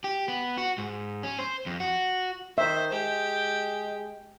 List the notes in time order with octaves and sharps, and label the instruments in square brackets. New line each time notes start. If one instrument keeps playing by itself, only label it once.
[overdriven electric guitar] G4
B3
F#4
G#2
C#4
C5
F2
F#4
[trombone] D#3 [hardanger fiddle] C5 [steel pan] E5
[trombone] G#3 [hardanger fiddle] G4